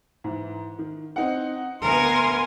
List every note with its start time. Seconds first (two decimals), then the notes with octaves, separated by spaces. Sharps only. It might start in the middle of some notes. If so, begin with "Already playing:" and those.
0.24 G#2 E3
0.79 D#3
1.16 C4 D#4 F#5
1.83 D2 B3 A#4 G#5 C6